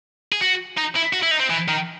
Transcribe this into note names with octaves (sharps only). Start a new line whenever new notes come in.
G#4
F#4
D#4
E4
F#4
E4
D#4
C4
E3
D#3